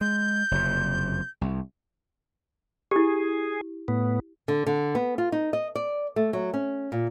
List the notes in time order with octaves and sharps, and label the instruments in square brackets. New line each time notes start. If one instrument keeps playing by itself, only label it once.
[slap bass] G#3 [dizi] G6
[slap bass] F#1 F2 C3
C2
[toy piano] E4 G4 [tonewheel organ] G#4
[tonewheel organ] A2 B3
[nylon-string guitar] D3
D3
B3
F4
D#4
D#5
D5
A3
F#3
C#4
A#2